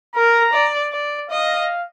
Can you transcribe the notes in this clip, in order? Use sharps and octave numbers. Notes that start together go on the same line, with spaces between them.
A#4 A#5
D5
D5
D#5 F5